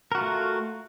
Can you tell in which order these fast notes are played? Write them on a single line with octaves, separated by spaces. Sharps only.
A#4 F#4 F4 A3